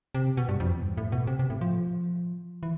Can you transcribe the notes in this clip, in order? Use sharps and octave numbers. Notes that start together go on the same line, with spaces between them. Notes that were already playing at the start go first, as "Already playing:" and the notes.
C3
B2
G2
F2
E2
G2
A2
B2
C3
C3
A2
F3
E3